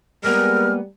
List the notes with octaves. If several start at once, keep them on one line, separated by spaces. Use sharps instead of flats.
G3 G#3 A#3 B3 A#4 F6